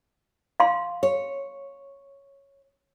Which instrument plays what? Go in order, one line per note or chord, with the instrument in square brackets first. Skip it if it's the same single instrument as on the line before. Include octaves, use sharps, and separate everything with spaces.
[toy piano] F5 C6
[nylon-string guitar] C#5